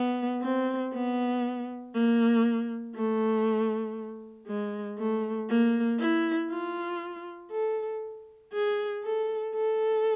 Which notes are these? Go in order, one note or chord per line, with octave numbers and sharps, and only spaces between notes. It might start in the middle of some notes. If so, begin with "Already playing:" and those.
Already playing: B3
C4
B3
A#3
A3
G#3
A3
A#3
E4
F4
A4
G#4
A4
A4